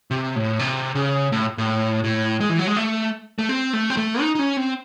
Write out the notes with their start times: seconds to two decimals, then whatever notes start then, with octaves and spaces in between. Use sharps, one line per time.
0.11 C3
0.36 A2
0.59 C3
0.95 C#3
1.32 A2
1.58 A2
2.04 A2
2.40 G#3
2.50 E3
2.59 F#3
2.67 G#3
2.76 A3
3.39 A3
3.49 C4
3.73 A3
3.90 C4
3.97 A3
4.21 D#4
4.35 D#4
4.39 C#4
4.57 C4